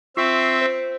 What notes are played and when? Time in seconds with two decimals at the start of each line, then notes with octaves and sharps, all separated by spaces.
0.17 C4 F4 E5 C#6 C7
0.61 C5